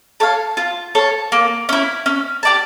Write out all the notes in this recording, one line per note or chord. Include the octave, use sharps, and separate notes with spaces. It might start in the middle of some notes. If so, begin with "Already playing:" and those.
A4 C#5 F5
F4
A4 C#5 F5
A#3
C#4 E4
C#4
G4 D5 A5